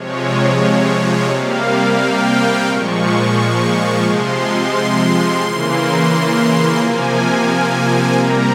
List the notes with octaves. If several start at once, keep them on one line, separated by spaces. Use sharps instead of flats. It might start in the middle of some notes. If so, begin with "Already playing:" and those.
Already playing: C3 F3 G#3 C#5
C3 G3 A#3 F5
G5
A#2 F3 G#3 C#6
C3 F3 G#3 C6
C6
C#3 E3 A#3
C3 F3 A#3 G#5
C3 G3 A#3 A#5